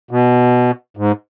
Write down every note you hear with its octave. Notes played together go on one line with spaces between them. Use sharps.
B2
G#2